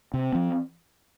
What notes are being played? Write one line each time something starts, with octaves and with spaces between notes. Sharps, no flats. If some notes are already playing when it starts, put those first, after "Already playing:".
C3
F3 C4